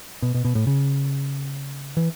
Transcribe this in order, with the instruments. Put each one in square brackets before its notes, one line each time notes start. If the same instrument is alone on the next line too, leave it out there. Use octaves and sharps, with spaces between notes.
[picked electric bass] B2
B2
B2
A2
C#3
E3